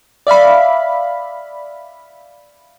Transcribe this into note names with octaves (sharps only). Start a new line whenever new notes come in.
D5 E5 F5 B5